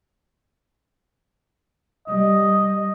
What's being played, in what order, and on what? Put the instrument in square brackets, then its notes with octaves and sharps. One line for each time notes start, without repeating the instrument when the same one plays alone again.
[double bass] G3 [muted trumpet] D#5